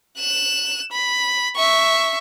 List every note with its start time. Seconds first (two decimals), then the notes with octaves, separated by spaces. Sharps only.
0.19 F#6 E7
0.92 B5
1.56 E5 C#6